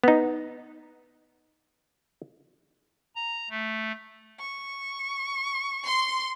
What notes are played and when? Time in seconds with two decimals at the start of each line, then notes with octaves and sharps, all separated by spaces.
0.04 B3 D#4
3.16 A#5
3.50 A3
4.39 C#6
5.86 C6